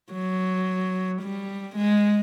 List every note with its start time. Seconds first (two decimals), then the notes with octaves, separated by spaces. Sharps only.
0.13 F#3
1.22 G3
1.76 G#3